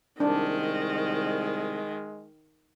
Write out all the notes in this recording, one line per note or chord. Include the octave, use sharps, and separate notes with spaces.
C2 D#3 G#3 D4